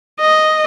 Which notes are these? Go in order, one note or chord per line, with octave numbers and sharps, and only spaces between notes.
D#5